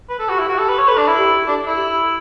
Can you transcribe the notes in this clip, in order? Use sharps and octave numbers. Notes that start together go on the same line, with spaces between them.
B4
A4
F#4 G4
E4
F#4
A4
B4
C#5
A4 B4
D4
E4
G4
D4 A4
E4
G4